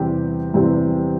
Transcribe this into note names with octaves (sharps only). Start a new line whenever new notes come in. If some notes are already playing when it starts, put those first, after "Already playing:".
Already playing: E2 C3 G3 C4 G4
E2 C3 G3 C4 G4